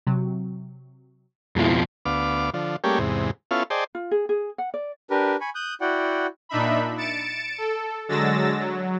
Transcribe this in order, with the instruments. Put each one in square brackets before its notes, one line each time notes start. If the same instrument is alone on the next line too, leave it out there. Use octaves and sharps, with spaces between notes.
[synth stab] C3 F#3
[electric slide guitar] F2 B2 F3 [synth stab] G#3 E4
[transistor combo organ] D2 B3 F5 D6
D3 F3
G3 A3 A#3 C#4 G4 G#4
E2 G#2 C3
B3 C#4 E4 F4 A4 F5
G#4 C5 D5 D#5 G5 A5
[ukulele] F4
G#4
G#4
F#5
D5
[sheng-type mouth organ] D4 G4 A#4 B4
G#5 B5 C#6
D#6 F#6 G6
E4 F#4 D5 F#5 G5
[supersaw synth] A#2 D4 D#4 E5 B5
A6 C#7 D7 E7
A4
D3 F#3 G#3 E6 A6 A#6
F#3